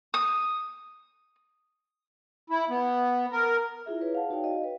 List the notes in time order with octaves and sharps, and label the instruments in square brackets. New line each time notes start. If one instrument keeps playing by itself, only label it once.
[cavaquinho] D#6
[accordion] E4
B3
A#4
[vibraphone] E4 F4 G#4 E5
G#4 B4 C#5
F5 F#5 A5
D#4 F#4 C#5 D5 F5 G5
D#5 F5
B4